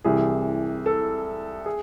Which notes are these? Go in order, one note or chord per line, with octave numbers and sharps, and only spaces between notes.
C2 C3 E3 G#4
A4
G#4